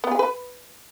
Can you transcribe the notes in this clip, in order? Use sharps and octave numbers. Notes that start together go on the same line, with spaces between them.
B3
G#4
B4